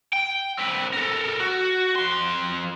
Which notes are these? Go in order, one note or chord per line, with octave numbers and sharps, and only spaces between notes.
G5
C4 B4
A4 A#4
F#4
F2 C6